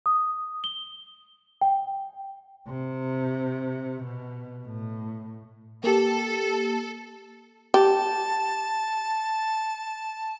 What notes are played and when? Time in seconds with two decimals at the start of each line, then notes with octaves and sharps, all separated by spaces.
0.06 D#6
0.64 G7
1.62 G5
2.67 C3
4.04 B2
4.66 A2
5.84 A#3 G4 A4
7.74 G4 A5